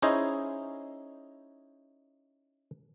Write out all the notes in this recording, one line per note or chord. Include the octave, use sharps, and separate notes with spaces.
C#4 D#4 E4 G#4 C5 D#5